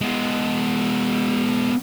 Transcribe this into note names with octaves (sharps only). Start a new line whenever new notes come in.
G#3 B3